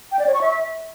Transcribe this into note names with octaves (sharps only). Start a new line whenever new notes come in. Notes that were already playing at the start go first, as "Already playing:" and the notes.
G5
D5
C#5
C#6
E5